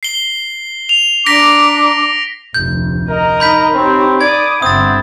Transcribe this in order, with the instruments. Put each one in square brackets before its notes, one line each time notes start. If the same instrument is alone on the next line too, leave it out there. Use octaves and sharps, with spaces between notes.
[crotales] C7 G7
F7
[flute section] D4 A#5 D6 [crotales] A#6 B6 D7
[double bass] F1 D2 [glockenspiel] G6
[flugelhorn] A#4 [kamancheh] D#5 A#5
[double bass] D#4 [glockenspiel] B5 G6 B6
[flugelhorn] C4 [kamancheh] G4 C#5
[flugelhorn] D5 [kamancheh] D6 D#6 [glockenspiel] G#6
[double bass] G1 D3 [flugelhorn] C4 [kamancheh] E5 F#5 [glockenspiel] D#6 A6